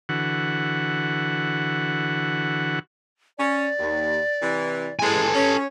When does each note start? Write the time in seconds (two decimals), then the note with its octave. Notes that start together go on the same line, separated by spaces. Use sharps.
0.09 D3 E3 F#4 F#5
3.38 C#4 D5
3.78 D#2
4.42 C3 E3
4.99 E3 G#3 A4 G#5
5.34 C#4 C#5